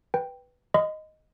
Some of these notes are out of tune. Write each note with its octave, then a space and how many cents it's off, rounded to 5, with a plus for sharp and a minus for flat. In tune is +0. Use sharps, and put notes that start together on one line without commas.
B4 +0 G5 +0
D#5 +0 C6 -45